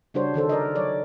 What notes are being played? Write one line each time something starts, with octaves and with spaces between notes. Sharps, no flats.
C#3 G3 D4 F#4 C5 C#5
D3 D#3 A4 C5
D#4 A#4 D5 D#5
F#3 C#5 D5